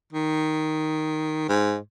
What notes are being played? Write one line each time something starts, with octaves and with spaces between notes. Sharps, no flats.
D#3
G#2